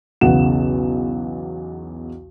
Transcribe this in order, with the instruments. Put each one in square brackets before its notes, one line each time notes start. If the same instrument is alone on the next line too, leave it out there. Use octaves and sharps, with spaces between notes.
[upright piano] B1 E2 C#3 F#5 E7